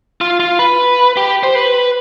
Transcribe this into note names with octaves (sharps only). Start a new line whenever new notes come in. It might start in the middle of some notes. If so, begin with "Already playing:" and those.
F4
F4
B4
G4
C5
B4